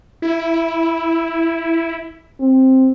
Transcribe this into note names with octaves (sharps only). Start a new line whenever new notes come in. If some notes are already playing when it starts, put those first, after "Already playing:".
E4
C4